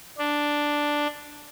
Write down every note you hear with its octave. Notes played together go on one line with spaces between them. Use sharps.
D4